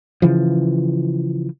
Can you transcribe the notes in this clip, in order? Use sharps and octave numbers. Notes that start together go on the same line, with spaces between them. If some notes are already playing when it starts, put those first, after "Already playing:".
C#3 E3 F3